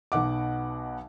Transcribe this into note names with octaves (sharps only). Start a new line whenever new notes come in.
B1 B2 F#5 D6